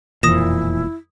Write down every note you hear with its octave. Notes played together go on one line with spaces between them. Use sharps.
E1 F2 A#2 E3 E4 D#6 A#6 E7